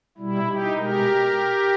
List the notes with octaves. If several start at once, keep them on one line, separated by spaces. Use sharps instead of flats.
B2 G3 E4
D#4 G4
B2 G#3 G4 A#4